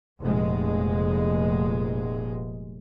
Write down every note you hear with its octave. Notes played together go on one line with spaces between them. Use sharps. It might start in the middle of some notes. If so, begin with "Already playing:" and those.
F1 A#2 G#3